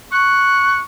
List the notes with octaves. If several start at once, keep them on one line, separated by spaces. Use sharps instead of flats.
C#6 F#6